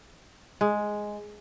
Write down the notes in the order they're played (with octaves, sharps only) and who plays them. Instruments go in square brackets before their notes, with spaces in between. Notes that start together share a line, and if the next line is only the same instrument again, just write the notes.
[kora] G#3